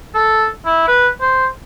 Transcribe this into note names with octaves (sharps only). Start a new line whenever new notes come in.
A4
E4
B4
C5